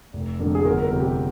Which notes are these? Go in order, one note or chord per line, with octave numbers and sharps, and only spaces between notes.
F1
F2 D3 F3 A#3
G#4
G1 A#4
A#4
F2 C3
G4